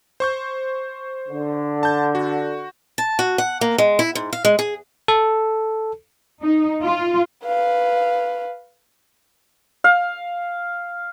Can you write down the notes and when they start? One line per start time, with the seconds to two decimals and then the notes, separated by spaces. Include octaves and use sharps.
0.20 C5 C#6 G6
1.28 D3
1.83 A5 G6
2.15 F#4
2.98 A5
3.19 F#4
3.38 F#5
3.61 A#3
3.78 G#3
3.99 E4
4.15 G#2
4.33 F5
4.45 G#3
4.59 G#4
5.08 A4
6.42 D#4
6.82 F4
7.44 B4 F5
9.84 F5